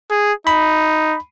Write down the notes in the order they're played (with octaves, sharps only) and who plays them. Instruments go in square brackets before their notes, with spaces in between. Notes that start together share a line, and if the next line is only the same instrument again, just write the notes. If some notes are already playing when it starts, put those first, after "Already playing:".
[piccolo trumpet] G#4
[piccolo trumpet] D#4 [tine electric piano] B5